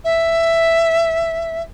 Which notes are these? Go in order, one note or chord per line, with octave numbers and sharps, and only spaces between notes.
E5